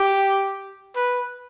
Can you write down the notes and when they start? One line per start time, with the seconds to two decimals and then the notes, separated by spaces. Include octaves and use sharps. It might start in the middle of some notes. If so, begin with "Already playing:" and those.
Already playing: G4
0.96 B4